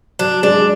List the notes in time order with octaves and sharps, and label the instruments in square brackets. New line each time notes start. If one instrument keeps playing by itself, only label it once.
[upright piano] F#3 [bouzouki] D4
[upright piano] G#3 [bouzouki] D4